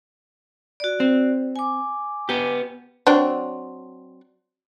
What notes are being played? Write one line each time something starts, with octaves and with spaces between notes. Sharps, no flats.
F#4 D5
C4
G#5 D6
B3 G4
F#3 C4 D4